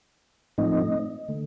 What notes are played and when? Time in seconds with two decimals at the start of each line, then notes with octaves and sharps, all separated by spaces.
0.58 A2 F3 A3 C4 D#4 D#5
1.28 D3 A3